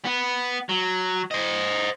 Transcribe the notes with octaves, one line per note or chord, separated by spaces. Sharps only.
B3
F#3
C5 D#5